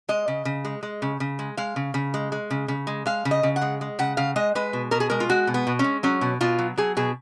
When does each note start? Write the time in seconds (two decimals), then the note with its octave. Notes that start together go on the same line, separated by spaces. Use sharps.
0.09 G#3 D#5
0.28 C#3
0.45 C#3
0.65 G#3
0.83 G#3
1.02 C#3
1.20 C#3
1.39 G#3
1.57 G#3 F5
1.76 C#3
1.94 C#3
2.14 G#3
2.32 G#3
2.51 C#3
2.68 C#3
2.87 G#3
3.06 G#3 F5
3.25 C#3
3.31 D#5
3.43 C#3
3.56 F#5
3.61 G#3
3.81 G#3
3.99 C#3 F#5
4.17 C#3 F5
4.36 G#3 D#5
4.55 G#3 B4
4.73 B2
4.91 B2 A#4
5.00 G#4
5.10 G#3 A#4
5.20 F4
5.29 G#3 F#4
5.47 B2
5.54 B3
5.67 B2
5.79 G#3 C#4
6.03 F#3 C#4
6.21 B2
6.41 B2 F4
6.59 F#3
6.77 F#3 G#4
6.97 B2 G#4